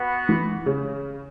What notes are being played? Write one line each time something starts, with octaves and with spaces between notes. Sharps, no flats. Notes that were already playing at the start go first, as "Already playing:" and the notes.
Already playing: B3 F#4 B4 F#5
E3
C#3